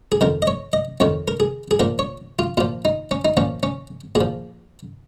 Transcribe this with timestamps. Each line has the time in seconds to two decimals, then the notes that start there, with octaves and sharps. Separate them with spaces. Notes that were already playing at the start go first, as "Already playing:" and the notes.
0.12 G#4
0.21 F2 D#3 A#4
0.42 D#5
0.47 C#5
0.73 D#5
1.00 F2 D#3 C#5
1.28 A#4
1.40 G#4
1.71 G#4
1.80 A#2 F3 A#4
1.99 C#5
2.39 F4
2.57 A#2 F3 F4
2.85 D#4
3.11 C#4
3.25 D#4
3.37 A#2 F3 C#4
3.63 C#4
4.15 A#2 G#4
4.21 F3